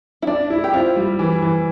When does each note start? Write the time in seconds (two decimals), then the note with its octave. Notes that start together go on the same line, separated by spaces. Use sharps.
0.22 E4
0.27 D4 D5
0.50 E4
0.64 G4
0.73 C4 F4
0.96 G3
1.19 E3
1.42 E3